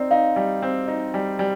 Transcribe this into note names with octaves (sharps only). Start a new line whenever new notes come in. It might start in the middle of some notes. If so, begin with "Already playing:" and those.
Already playing: C4 D#4 D5
D#4 F5
G3
C4
D#4
G3
G3